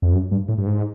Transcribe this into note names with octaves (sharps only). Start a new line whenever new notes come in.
F2
F#2
G2
A2
G2
G#2